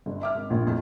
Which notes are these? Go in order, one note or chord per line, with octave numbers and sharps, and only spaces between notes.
G1
E5 D6 F6
G#1
A#1 A#2 F3
F2 A2